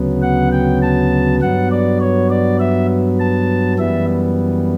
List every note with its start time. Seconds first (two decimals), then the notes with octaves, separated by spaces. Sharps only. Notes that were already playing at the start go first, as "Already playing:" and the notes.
Already playing: D2 C#3 F#3 B3
0.22 F#5
0.52 G5
0.82 A5
1.42 G2 F#3 B3 F#5
1.71 D5
2.01 C#5
2.30 D5
2.60 E5
3.20 A5
3.79 F#2 E3 G3 B3 E5